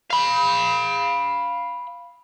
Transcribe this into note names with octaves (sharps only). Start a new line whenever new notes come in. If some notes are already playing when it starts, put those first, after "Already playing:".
F5 B5